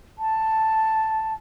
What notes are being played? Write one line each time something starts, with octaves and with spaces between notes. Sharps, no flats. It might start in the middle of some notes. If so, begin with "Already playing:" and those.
A5